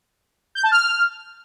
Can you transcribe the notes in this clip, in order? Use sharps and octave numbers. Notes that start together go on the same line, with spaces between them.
G6
A5
F6